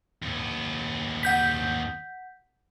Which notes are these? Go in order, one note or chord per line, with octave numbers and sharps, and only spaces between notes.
D#2 B3
F#5 G6 B6